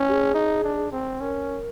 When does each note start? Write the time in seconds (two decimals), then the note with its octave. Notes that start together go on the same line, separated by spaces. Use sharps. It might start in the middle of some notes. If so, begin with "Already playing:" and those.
Already playing: C#4
0.09 G4
0.12 G#4
0.34 D#4
0.64 D4
0.92 C4
1.20 C#4 A#4